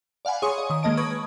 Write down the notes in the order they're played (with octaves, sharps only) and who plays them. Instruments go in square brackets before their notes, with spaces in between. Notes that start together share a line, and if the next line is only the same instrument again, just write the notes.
[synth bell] D5 F5 F#5 G#5 B5
G#4 C#5 G#5 C6 C#6 D#6
C#5 D#5
D#3 D#6
D#3 G#3 A#3 D#5 A5 D7
B4 B5 C#6 D#6 G#6